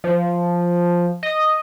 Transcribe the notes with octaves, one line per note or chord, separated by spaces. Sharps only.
F3
D#5